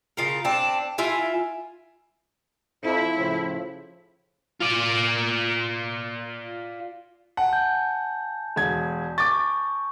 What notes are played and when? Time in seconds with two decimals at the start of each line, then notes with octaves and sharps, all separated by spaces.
0.17 C#3 F4 A#4
0.45 C4 D4 A5
0.98 E4 F4 E5 G#5
2.84 F2 E4
3.15 A2 C#3 F3
4.61 F4 D5
7.37 F#5 G#5 A5
7.53 G6
8.56 E1 G#6
9.18 C#6 D6 A6